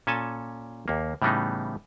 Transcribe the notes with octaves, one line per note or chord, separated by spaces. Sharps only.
A#2 C#4 A4 G#5 A5
D#2 A#3
A2 C#3 E3 G3 B3 D#4